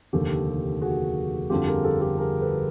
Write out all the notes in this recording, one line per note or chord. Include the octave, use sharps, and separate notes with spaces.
F1 D#2 D3 G4 A4
F#4 G#4
G1 F2 D3 F3 F4 G4
G#4 A#4
G4 A4
G4 A4
G#4 A#4
A4 B4